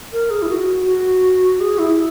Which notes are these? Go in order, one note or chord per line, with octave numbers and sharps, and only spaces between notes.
A#4
G#4
E4
F#4
F#4
G#4
E4